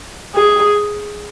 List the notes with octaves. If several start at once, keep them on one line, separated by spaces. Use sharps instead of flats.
G#4